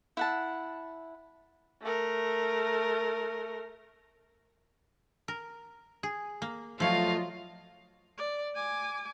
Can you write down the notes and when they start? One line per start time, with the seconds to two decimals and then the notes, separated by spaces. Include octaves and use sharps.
0.17 E4 F#5 A5
1.82 A3 A#4
5.28 A#4
6.03 G#4
6.42 A#3
6.80 F3 F#3 A3 F4 C#5 D#5 F5
8.18 D5
8.55 G#5 D6